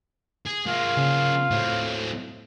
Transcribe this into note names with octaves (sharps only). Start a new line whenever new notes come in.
G#4
A#3 F4 G#4
C#3
A2 F#3 C4